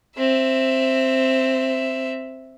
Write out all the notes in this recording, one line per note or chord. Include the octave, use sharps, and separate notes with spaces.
C4 E5